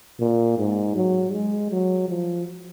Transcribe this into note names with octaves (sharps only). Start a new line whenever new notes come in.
A#2
G#2
F#3
G#3
F#3
F3